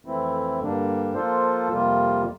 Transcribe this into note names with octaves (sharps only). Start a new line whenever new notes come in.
F2 E3 A3 C4 E4
G2 D3 G3 A#3 D4
F3 A#3 F4 A4 C5
F2 C3 G3 A#3 F4